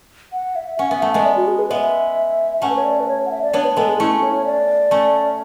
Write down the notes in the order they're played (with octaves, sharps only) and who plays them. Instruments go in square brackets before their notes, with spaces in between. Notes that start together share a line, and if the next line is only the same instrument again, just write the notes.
[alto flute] F#5
E5
[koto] C#4 [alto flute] F#5
[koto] B3 [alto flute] E5
[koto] A3 [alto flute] F#5
[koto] G#3 B3 [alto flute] E5
[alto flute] D5
F#4
G#4
B4
[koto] G#3 B3 [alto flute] E5
[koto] A3 C#4 [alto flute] F#5
[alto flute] B4
C#5
D5
B4
C#5
F#5
E5
D5
[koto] B3 D4 [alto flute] C#5
[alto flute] B4
[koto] G#3 B3 [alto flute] A4
[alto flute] G#4
[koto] A3 C#4 [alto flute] E4
[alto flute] C#5
C#5
D5
[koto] A3 C#4